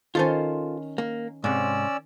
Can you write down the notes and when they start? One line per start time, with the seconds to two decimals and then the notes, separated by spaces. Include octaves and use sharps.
0.15 D#3 C#4 F4 A4 C5
0.98 A#3
1.44 G#2 C3 C#4 D5 E6